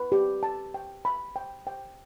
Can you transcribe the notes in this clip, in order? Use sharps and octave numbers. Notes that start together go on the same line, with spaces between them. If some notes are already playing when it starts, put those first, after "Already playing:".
Already playing: B4
G4
A5
G5
B5
G5
G5